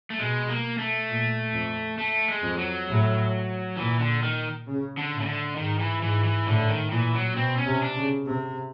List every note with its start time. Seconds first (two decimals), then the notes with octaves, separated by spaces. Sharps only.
0.10 A3
0.18 B2 G#3
0.49 A#3
0.78 A3
1.09 A#2
1.54 F2
1.98 A3
2.28 G#3
2.42 F2
2.58 F#3
2.88 A2
3.77 A#2 E3
4.00 D3
4.23 D#3
4.67 C#3
4.97 D3
5.12 A2
5.20 C#3
5.26 D3
5.56 G#2 D#3
5.79 E3
6.01 G#2 E3
6.24 E3
6.46 A2 D3
6.68 D#3
6.91 A#2 E3
7.14 F#3
7.36 B2 C4
7.58 C#4
7.66 C3
7.81 D4
7.96 C#3
8.26 C3